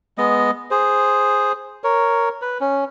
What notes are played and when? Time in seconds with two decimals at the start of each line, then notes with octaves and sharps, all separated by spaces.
0.18 G#3 B3 D#5
0.71 G#4 C5
1.84 A#4 C#5
2.42 B4
2.61 C#4